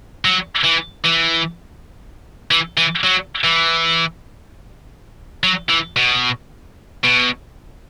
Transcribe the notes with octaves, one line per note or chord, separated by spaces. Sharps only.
F#3
E3
E3
E3
E3
F#3
E3
F#3
E3
B2
B2